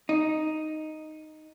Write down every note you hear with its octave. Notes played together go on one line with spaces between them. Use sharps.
D#4